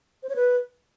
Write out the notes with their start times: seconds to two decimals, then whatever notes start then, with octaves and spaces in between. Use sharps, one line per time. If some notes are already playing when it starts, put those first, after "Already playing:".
0.23 C5
0.29 C#5
0.36 B4